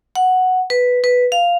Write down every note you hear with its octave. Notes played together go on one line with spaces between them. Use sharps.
F#5
B4
B4
F5